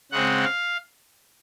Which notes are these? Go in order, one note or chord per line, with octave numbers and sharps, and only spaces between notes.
C#3 G#3 C4 F#5
F5